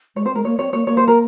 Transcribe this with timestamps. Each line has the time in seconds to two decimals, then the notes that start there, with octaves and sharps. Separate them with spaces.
0.16 G#3 C#5
0.26 C4 C5
0.35 G#3 A#4
0.45 A#3 C#5
0.59 C4 C#5
0.73 A#3 C#5
0.87 A#3 C#5
0.97 C5
1.08 A#4